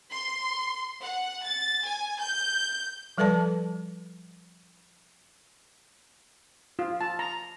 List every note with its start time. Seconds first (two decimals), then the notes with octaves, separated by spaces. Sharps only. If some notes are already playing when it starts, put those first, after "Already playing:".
0.12 C6
1.02 F#5
1.44 A6
1.84 G#5
2.21 G6
3.18 F3 G3 A4 B4 D5 A5
6.79 F4
7.01 A5
7.19 A#5